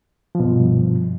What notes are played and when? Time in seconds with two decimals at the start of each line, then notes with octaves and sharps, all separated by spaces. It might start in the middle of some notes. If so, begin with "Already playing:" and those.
0.35 F3
0.40 B2
0.45 G2